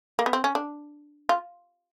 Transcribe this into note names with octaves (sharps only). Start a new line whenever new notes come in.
A#3
B3
C4
C#4
D4
F4